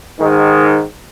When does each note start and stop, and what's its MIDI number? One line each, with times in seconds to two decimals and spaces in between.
0.19 0.81 44
0.19 0.81 51